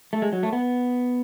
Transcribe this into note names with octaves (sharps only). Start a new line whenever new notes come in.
A3
G#3
F#3
A3
B3